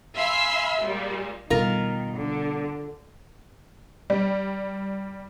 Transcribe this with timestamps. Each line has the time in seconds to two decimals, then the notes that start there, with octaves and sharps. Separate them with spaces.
0.15 E5 F5 G#5 B5 C6 E6
0.81 A#2 G3 G#3
1.50 B2 D#3 G3 F4 A#4
2.17 D3
4.10 G3